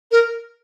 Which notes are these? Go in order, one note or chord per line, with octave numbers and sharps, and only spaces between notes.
A#4